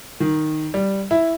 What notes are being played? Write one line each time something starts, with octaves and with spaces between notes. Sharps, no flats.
D#3
G3
E4